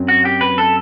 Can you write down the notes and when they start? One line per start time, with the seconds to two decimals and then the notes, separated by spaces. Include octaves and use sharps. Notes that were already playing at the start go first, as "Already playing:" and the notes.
Already playing: F#2 F#3 C4
0.08 F#4
0.25 G4
0.41 B4
0.58 A4